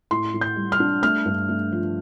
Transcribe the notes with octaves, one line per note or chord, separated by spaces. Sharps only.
A2 C6
A2
G6
G3
F6
D4
A3 F6
G2
A3
F3